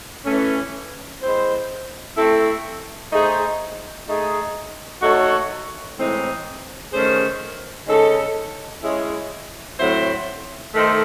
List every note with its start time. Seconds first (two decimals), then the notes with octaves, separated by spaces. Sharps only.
0.26 E3 A3 C#4
1.22 G#3 C4 E4 C5
2.16 A3 C4 E4 A4
3.12 A3 D#4 G#4 C5
4.07 A3 D#4 G#4
5.02 A3 D#4 F#4 A4 C#5
5.97 A2 E3 G#3 C4 D#4
6.93 D#3 A3 C#4 G#4 C5
7.88 C#3 G#3 D#4 A4
8.83 G#3 C#4 E4 G#4 C#5
9.79 A2 F#3 C4 E4 C5
10.74 D#3 A3 D#4 A4 C5